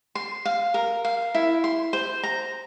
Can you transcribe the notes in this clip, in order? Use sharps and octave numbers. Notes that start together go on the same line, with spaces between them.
C6
F5
A#4
F5
E4
C6
C5
A#5